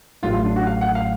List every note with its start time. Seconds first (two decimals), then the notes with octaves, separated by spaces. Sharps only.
0.23 A1 A2 F#3 A3 F4
0.34 F4
0.45 D4
0.56 F#4
0.67 F5
0.81 F#5
0.95 F5